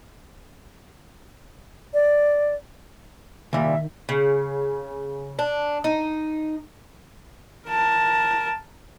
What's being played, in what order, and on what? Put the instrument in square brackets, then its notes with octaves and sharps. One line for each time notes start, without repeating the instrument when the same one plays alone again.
[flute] D5
[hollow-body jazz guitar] C2 A#2 G3 [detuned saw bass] D#3 [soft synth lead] E5
[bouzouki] C#3
D4
D#4
[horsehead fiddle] A#4 A5